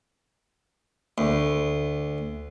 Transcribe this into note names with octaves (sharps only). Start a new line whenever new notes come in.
D2